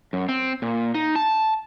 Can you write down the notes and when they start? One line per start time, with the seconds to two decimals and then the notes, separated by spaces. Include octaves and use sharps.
0.13 F#2
0.29 C4
0.62 A#2
0.95 D#4
1.16 A5